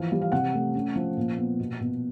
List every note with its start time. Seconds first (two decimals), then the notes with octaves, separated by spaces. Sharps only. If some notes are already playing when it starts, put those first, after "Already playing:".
Already playing: E3 F3 F5
0.12 G3
0.21 F5
0.32 C3 F#5
0.54 A3
0.75 C#4
0.96 F3
1.17 A#2
1.38 B3
1.60 B2
1.81 B2